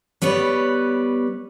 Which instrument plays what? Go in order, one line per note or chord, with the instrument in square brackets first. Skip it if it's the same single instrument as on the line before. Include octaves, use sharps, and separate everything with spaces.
[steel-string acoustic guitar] G3 B3 B4 C#5